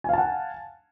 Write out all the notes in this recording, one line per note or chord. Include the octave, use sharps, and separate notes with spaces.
F5 F#5 G#5 A5